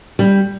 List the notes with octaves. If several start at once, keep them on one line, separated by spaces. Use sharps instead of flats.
G3